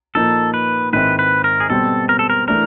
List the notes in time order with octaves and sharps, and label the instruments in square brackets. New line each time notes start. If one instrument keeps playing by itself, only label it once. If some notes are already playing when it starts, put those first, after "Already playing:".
[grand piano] A#2 F3 A#3 D#4 [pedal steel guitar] A4
[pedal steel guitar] B4
[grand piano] G#2 D#3 G#3 C4 E4 [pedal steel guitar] B4
[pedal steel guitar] B4
A#4
G#4
[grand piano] B2 G3 C4 [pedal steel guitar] A4
[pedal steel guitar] A#4
A4
A#4
[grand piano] E3 A3 D4 [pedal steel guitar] A#4